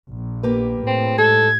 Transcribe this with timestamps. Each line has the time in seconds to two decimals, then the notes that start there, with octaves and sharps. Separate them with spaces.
0.12 A#1
0.43 A#3 G4 B4
0.87 A2 C4
1.18 G#2 A4 G#6